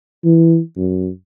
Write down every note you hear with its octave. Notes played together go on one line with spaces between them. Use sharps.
E3
F#2